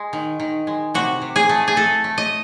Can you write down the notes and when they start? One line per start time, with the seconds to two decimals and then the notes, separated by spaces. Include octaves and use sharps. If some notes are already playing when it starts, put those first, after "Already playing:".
Already playing: G#3
0.13 D#3
0.40 D#3
0.67 G#3
0.94 C3 F#4
1.22 C3
1.36 G#4
1.49 A3
1.68 G#4
1.76 A3 A4
2.04 A3
2.18 D#5